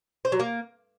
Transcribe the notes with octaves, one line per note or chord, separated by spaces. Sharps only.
C5
F#3
A#3